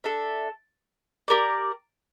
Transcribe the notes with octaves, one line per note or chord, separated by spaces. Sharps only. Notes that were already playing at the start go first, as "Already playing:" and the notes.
D4 A4 E5
G4 A#4 D5